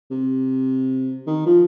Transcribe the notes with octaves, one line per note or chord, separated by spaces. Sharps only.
C3
D#3
F3